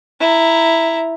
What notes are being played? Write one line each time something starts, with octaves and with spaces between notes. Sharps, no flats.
E4 A#5